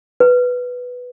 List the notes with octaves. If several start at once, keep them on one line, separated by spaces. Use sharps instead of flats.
B4